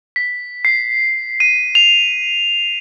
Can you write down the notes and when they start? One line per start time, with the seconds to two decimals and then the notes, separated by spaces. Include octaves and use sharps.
0.16 B6
0.65 C7
1.40 D#7
1.75 F7